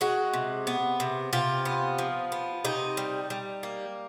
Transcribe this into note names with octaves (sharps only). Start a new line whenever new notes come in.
G#3 F#4
C3
B3
C3
C3 F4
B3
F3
B3
C3 D#4
G3
G3
A#3